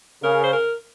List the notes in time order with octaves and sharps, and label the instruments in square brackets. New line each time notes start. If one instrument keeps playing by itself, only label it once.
[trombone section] C#3 [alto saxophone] A#4
[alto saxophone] C5
A#4